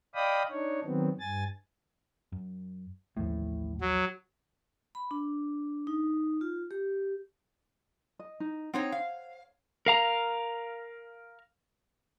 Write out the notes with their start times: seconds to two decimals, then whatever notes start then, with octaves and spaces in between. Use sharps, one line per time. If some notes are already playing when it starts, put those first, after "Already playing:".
0.15 D5 D#5 F5 G5 B5 D#6
0.50 D4 D#4 C#5
0.84 D#3 F#3 B3 C4
1.20 G2 G#5 A6
2.32 F#2
3.17 A1 D#2 A2 F3
3.81 F#3
4.95 B5
5.11 D4
5.87 D#4
6.41 F4
6.71 G4
8.19 D#5
8.40 D#4
8.74 C4 D#4 C5 C#5 F#5
8.92 F5
9.86 A#4 F5 A#5